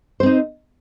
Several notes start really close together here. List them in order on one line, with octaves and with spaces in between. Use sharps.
C5 C4 D#4